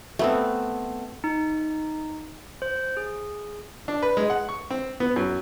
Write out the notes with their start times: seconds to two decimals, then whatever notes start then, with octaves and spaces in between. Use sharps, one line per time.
0.19 A3 B3 C4
1.24 D#4
2.62 C5
2.97 G#4
3.88 D4
4.02 B4
4.17 G#3
4.30 F#5
4.49 C#6
4.71 C4
5.00 B3
5.16 F#2